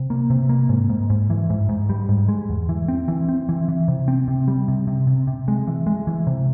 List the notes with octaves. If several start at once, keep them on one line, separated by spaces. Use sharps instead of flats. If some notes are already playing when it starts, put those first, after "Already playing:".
Already playing: C3
A#3
C3
A#3
G#2
G#2
G#2
E3
G#2
G#2
G3
G#2
G#3
E2
E3
C4
E3
C4
E3
E3
C3
C4
C3
G3
C3
C3
C3
C3
G#3
E3
G#3
E3
C3